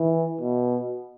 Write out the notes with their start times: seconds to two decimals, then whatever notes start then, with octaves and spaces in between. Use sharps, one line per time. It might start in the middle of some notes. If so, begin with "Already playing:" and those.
Already playing: E3
0.41 B2